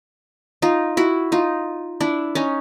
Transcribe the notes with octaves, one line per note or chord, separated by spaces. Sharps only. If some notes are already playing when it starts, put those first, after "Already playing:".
D#4 F4
E4 F#4
D#4 F4
D4 E4
C#4 D#4